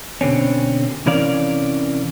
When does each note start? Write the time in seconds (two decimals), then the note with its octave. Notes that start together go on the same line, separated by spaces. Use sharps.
0.21 B2 D3 C4 C#4
1.06 C3 E3 C#4 A#4 D5 F5